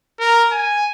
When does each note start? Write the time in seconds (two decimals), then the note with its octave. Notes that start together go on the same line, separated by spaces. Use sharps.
0.19 A#4
0.52 G#5